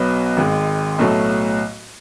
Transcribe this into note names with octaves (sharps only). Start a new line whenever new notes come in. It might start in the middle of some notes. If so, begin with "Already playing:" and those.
Already playing: B1 B2 F#3 B3
G#1 G#2 G#3
B1 A2 F#3 A3